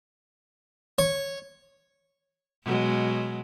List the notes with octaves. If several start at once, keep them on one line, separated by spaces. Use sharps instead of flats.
C#5
B2 F#3 G#3